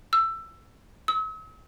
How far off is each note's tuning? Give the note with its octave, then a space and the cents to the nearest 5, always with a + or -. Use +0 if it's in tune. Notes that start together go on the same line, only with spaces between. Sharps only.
E6 +15
E6 -45